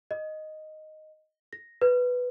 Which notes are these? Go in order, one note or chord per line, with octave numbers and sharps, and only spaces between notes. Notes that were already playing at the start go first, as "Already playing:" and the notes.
D#5
A#6
B4